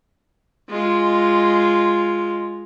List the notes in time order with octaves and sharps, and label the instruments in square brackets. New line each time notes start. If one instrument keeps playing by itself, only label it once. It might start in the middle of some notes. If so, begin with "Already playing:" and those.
[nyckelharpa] G#3 F4